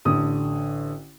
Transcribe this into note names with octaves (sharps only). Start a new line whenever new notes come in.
A1 D3 D#6